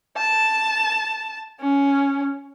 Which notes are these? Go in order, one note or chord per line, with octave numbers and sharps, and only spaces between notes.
A5
C#4